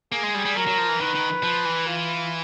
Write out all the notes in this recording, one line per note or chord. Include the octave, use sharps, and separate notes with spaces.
A#3 G#4
G#3
G3
G3
F#3 A#4
F#3
F3
E3
D#3 B4
D#3
F3
E3
F4